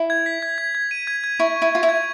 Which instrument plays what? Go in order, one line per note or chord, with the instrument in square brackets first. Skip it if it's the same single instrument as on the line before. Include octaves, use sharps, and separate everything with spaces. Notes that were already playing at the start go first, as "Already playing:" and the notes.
Already playing: [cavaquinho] E4
[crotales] G#6
B6
G#6
G#6
G#6
D#7
G#6
G#6
[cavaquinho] E4 [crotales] C#6
[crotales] C#6
[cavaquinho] E4
[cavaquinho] F4 [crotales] C#6
[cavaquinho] E4
[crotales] G#6